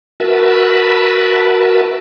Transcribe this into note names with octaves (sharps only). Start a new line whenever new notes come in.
F#4 A#4 B4 E5 A5 B5